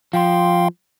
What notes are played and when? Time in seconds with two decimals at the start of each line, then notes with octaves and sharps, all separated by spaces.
0.13 F3 F5 G5 C6